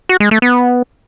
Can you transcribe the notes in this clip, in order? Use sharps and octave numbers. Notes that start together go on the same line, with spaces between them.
F#4
G#3
A3
B3